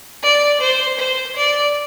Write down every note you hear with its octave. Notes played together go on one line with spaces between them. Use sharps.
D5
C5
C5
D5